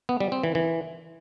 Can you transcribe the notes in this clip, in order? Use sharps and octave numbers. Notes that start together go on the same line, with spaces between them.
B3
G3
C4
E3
E3